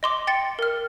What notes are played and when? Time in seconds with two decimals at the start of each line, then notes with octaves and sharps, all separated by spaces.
0.03 D#5 C6 D6
0.27 G5 A6 C#7
0.59 A#4 F6